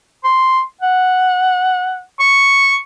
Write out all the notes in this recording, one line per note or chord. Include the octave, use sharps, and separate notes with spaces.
C6
F#5
C#6